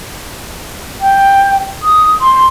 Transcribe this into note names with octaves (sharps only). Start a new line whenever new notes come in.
G5
D#6
C6